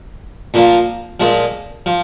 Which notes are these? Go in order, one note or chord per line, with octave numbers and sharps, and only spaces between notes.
A#2 F3 A#3
A#2 F3 G#3
F3